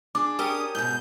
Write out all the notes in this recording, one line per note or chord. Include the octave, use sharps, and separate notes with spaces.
D4 G#4 D6
C#4 G4 A#4 D#6
G#2 B2 G6